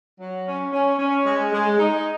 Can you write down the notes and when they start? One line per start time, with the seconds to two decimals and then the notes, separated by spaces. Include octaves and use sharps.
0.20 F#3
0.47 C#4
0.73 C#4
0.99 C#4
1.26 G#3
1.52 G#3
1.79 D#4